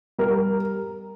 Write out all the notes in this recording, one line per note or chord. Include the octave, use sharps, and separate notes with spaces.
G3 A#4